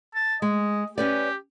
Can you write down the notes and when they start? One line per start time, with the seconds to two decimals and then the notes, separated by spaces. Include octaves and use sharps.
0.15 A5
0.42 G#3 D#5
0.98 C#4 G4 B4 D5